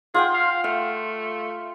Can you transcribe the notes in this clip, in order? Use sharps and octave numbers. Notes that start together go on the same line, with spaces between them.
F4 G#4 F#5 G5
F5
A3 F5